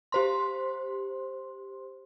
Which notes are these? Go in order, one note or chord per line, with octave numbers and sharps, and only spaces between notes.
G4 C5 C6